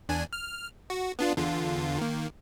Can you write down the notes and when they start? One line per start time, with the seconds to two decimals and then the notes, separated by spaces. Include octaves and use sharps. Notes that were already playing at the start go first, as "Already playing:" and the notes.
0.09 E2 D4 G#5
0.33 F6
0.90 F#4
1.19 B3 D4 F4
1.37 E2 D3 F4
1.98 D#3 A#3